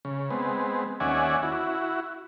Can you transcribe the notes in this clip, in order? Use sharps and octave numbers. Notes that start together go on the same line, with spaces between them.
C#3
G#3 B3 C4
D#2 C#4 D5 E5 F#5 G#5
E4 F#4